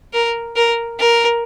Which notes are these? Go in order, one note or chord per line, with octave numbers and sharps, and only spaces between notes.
A#4
A#4
A#4